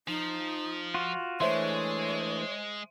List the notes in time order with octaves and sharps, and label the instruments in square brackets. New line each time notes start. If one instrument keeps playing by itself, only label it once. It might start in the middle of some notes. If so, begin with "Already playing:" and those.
[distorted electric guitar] F3 [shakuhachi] D#4
[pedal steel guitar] F4 F#4
[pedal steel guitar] E3 A3 D4 [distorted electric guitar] G#3 [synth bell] C5 E5 C6 [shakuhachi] C#5